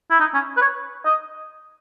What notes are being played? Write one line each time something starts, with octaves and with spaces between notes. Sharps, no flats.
E4
D#4
C#4
B4
C#5
D#5